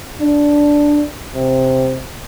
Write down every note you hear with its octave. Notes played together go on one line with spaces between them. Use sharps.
D4
C3